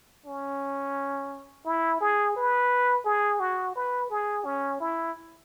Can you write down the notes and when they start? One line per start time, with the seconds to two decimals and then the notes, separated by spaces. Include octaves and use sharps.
0.26 C#4
1.65 E4
2.01 G#4
2.36 B4
3.05 G#4
3.40 F#4
3.76 B4
4.10 G#4
4.45 C#4
4.80 E4